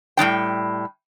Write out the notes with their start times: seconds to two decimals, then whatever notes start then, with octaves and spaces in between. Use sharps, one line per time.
0.17 A2 G3 D4 G5